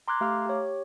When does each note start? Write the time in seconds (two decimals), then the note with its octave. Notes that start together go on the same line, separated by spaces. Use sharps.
0.08 A#5 C6 D6 F6 F#6 G#6
0.21 A3 G4 F5 A#5 D6 F6
0.46 G4 C#5